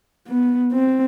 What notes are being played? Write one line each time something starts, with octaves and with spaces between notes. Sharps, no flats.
B3
C4